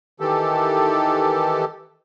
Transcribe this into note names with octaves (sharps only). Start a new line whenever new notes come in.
D#3 E3 G4 A4